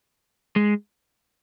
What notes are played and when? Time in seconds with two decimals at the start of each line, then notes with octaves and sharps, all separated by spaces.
0.56 G#3